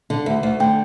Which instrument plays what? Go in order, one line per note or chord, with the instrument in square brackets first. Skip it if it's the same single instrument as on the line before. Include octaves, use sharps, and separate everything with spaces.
[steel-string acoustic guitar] D3
D2
D2
[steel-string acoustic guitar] D3 [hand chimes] G5